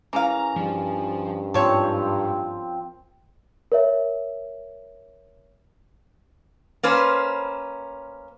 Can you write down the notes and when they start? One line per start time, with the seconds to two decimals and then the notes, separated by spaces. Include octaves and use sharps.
0.13 E3 C#4 G#4 A#4 F5 A#5
0.56 G2 F3
1.54 G#2 F3 C4 A4 C#5
3.72 A#4 C#5 E5
6.83 A#3 C#4 B4 C5